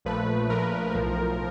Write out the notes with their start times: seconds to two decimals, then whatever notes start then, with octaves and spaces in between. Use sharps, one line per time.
0.05 A#1 A#2 F3 A3 B4
0.50 A#1 A#2 F3 A3 A#4
0.95 B1 A2 F3